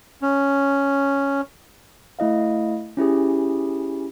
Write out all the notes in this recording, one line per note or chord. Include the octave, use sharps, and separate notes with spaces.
C#4
A3 E4 D#5 F5
C#4 E4 G4 G#4